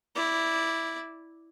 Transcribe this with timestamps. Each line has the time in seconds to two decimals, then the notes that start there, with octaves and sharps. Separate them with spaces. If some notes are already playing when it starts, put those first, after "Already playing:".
0.15 E4 D5